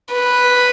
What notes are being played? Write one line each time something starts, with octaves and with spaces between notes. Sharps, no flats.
B4